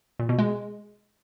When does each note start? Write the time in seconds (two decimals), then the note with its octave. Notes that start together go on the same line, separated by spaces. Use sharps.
0.19 A#2
0.29 B2
0.39 G#3